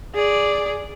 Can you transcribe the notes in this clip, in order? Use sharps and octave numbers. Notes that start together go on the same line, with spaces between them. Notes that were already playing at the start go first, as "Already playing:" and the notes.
G#4 D5